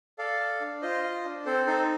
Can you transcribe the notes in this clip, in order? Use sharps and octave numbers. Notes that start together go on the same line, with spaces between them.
A4 D5 F5
A4
D4
F4 C5 D#5
F4
D4
C4 A4 C5
D#4 A4 C5